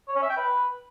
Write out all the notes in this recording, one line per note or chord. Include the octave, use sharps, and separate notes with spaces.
C#5
C#4
E5
G5
B4